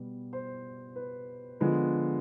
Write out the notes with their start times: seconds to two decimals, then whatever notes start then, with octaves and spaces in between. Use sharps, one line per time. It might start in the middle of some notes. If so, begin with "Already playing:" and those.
Already playing: B2 G3 B3
0.33 C5
0.96 B4
1.60 D3 F3 G#3 B3